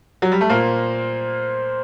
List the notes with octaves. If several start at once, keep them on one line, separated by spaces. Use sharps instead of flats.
F#3
G3
A3
A#2 A#3 C5